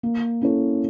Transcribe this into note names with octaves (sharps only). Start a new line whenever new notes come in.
A#3
C#4 E4 A4 C#5